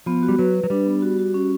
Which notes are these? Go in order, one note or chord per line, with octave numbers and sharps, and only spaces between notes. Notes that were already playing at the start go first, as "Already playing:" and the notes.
F3 B3
F#4
G3
F#3 B4
B4
F#3
G3 D4
B3
F#4
F#4
C#4